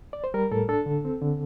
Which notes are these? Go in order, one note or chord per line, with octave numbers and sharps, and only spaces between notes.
D5
C5
G3 A#4
A2 A4
D4 A4
D3
C4
D3